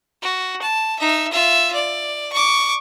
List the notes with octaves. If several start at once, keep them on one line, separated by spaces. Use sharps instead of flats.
F#4
A5
D#4 E5
F4 E5
D5
C#6 D6